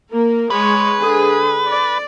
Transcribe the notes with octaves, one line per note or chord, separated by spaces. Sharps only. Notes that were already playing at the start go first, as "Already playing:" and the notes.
A#3 A#4
G#3 B4 C#5
D3 G#4
D5